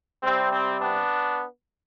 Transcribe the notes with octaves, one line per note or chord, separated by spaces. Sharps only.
C3 G3 C4
C4
B3 D4